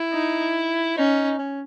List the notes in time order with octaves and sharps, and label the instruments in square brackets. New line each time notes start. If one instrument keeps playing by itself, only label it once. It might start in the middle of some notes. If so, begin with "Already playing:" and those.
Already playing: [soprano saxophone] E4
[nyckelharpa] D#4
[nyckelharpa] C#4 [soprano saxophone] D#4
[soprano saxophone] C#4